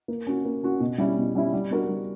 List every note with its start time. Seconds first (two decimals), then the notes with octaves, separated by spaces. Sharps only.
0.08 A#3
0.27 C#4 F#4
0.45 A#3
0.63 C#4 F#4
0.80 B2
0.98 G3 C#4 E4
1.17 B2
1.35 G3 C#4 E4
1.53 G3
1.71 B3 D4 F#4 A#4
1.89 G3